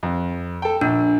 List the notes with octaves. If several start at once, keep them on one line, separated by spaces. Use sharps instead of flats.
F2
A4 G5
A#1 D4